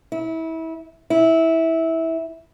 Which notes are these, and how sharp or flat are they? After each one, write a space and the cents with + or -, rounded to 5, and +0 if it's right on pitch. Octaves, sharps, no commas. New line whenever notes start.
E4 -25
E4 -15